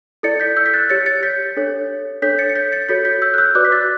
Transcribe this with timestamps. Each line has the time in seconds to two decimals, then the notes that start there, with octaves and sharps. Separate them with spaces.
0.23 E4 A4 D5 A6 C#7
0.40 G6 B6
0.57 E6 G6
0.66 B6
0.74 F#6 A6
0.90 G4 C#5 A6 C#7
1.06 A6 C#7
1.23 G6 B6
1.57 D4 A4 C#5
2.22 D4 A4 C#5 G6 B6
2.38 A6 C#7
2.49 C#7
2.55 G6 B6
2.72 A6 C#7
2.89 F#4 A4 C#5 G6 B6
3.05 G6 B6
3.22 E6 G6
3.34 F#6
3.38 E6 G6
3.55 F#4 B4 D5 D6 F#6
3.65 B6
3.72 F#6 A6